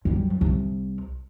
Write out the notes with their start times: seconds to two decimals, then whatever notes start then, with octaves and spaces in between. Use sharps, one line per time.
0.05 F#2 G3
0.41 C2